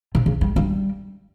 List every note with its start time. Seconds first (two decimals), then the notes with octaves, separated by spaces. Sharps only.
0.15 C3
0.26 C#3
0.41 G3
0.56 G3